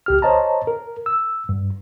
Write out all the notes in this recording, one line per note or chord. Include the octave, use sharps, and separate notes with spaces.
C#2 G4 F6
C5 C#5 D#5 A5 A#5
A#4
E6
G2